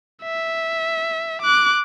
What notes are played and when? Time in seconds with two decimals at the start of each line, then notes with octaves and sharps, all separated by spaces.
0.23 E5
1.42 D6 F#6